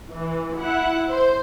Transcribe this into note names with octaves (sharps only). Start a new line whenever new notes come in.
E3
E4 F#5
C5